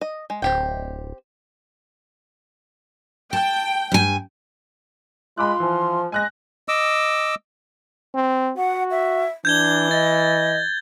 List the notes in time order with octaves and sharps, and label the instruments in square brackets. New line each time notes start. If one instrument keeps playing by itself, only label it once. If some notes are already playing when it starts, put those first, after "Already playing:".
[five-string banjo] D#5
G#3
[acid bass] D1 [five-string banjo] C4 G4 G5
[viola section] G5 [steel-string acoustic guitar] A5
[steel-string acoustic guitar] G2 G#5
[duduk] G#3 [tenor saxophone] F4 [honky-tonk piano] B5 D6 F#6 [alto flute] C6
[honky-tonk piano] E3 [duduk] F3
[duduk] G#3 [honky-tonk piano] G#5 F#6 A#6
[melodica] D#5 D6 E6
[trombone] C4
[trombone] F#4 [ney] F#5
[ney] E5
[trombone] E3 [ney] D4 [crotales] G6 G#6 G7
[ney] D#5 [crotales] A6